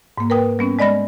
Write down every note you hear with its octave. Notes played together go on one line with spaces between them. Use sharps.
G#2 A#3
A#4 B4 G5 D#6
G3 B3 C#4
G#3 D5 D#5 B5 A#6